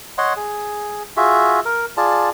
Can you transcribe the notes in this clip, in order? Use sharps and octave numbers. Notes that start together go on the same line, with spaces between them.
C#5 D#5 F#5 C6
G#4
F4 F#4 G#4 E5
A#4
F4 G#4 D5 A5